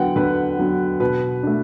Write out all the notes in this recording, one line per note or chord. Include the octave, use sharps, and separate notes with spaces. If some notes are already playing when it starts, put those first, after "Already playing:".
Already playing: D3 F#3 B3 D4 F#5 G5
D3 B4
F#3 B3 D4
B2 B4
A3 D4